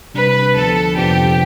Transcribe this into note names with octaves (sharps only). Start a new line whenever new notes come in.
C3 G3 D4 B4
D2 D3 F3 B3 D4 A4
F2 C3 F3 B3 D4 G4